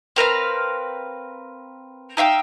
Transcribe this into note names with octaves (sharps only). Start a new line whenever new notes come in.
C4 A#4 B4 F5
D#4 E5 F5 G5